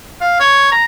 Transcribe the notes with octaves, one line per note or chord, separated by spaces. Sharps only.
F5
C#5
A#5